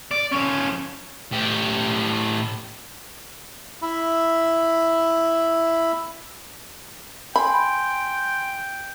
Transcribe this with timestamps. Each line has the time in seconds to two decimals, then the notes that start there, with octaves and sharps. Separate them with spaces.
0.11 D5
0.32 F3 C#4
1.32 A2 G4
3.82 E4 E5 B5
7.36 G5 G#5 B5 C6